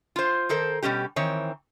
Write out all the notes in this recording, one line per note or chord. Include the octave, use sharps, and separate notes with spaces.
F4 C5
D#3 A4 A#4 C5
B2 G3 C#4 G4
D#3 E3 C4 C#5